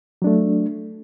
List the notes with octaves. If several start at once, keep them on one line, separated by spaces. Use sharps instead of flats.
F#3 A3 D4